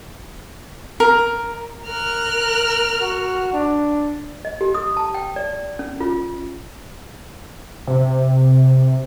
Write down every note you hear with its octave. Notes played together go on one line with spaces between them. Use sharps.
A#4
A#4 F6 F#6
F#4
D4
D#5
G4
D#6
A5
G5
D5
C#4
F4
C3